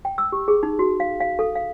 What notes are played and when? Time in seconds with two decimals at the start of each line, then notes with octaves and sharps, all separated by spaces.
0.05 G5
0.18 E6
0.32 G4
0.48 G#4
0.63 D#4
0.79 F#4
1.00 F5
1.21 F5
1.39 A4
1.55 F5